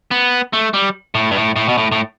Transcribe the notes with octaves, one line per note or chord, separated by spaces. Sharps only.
B3
A3
G3
A2
G2
A2
A2
B2
A2
A2